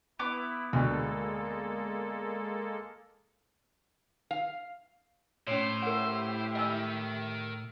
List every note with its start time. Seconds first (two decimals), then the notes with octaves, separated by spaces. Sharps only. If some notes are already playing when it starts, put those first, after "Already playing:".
0.19 B3 E4 D6
0.73 D2 B2 G#3 A#3 A4 D5
4.31 F5
5.47 A2 C#4 C5 C#5
5.82 E4 G4 A#4 F#5
6.55 A#4 D#5 G5 G#5 E6